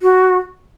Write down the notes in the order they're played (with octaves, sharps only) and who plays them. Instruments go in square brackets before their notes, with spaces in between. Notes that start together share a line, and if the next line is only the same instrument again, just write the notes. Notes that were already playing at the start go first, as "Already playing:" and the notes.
[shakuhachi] F#4